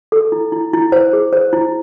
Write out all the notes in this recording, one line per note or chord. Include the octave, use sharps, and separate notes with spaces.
A4
E4
E4
E4
C5
G#4
C5
E4